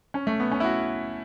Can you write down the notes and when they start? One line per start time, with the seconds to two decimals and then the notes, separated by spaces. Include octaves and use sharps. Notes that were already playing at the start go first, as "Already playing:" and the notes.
0.14 C#4
0.27 A3
0.40 B3
0.52 C#4
0.60 E4
0.64 F#4